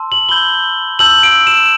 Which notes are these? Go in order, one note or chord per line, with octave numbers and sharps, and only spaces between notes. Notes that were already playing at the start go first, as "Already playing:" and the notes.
Already playing: A5 C6 E6
F#7
B5 E6 G6 G7
A5 E6 G6 F#7
D7
E7